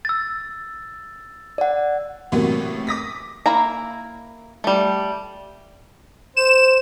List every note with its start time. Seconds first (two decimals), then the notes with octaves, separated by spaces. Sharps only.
0.05 E6 A6
1.58 D5 F#5
2.32 A2 C3 E3 F#3 A#3 B3
2.87 D6 D#6 A#6 B6
3.46 A#3 E4 A#5
4.64 G3 A3
6.37 C5 E7